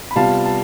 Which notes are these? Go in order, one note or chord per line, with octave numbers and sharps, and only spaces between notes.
B5
C3 G3 B3 F4 F5 A5
A5